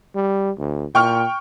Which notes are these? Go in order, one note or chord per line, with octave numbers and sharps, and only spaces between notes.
G3
D2
A#2 G5 C#6 F6